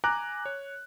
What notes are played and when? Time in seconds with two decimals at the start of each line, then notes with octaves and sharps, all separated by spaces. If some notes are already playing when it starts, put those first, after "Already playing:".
0.04 G#5 A#5 D6 F#6
0.45 C#5